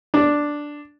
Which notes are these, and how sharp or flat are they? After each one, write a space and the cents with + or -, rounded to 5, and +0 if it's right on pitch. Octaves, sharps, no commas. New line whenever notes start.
D4 +0